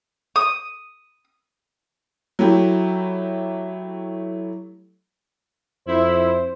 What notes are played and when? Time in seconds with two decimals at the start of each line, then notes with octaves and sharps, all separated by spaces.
0.36 D#6
2.39 F#3 A3 E4 G4
5.87 F2 E4 C5